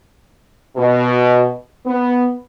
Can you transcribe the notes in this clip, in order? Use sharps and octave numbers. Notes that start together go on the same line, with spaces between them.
B2
B3